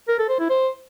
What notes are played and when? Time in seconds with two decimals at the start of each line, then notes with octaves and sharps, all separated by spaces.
0.08 A#4
0.18 A4
0.29 C5
0.39 E4
0.50 C5